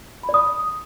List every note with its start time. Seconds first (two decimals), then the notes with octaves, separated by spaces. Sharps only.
0.23 B5
0.29 D5
0.34 D#6